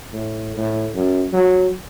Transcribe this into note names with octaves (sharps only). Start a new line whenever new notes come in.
A2
A2
F#2
F#3